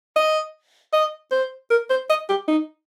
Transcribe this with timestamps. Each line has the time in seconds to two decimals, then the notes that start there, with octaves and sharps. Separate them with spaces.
0.16 D#5
0.93 D#5
1.31 C5
1.70 A#4
1.90 C5
2.10 D#5
2.29 G4
2.48 D#4